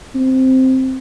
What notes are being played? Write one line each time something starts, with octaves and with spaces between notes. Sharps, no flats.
C4